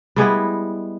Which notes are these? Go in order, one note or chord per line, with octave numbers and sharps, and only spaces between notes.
G3 G#3 B3 E4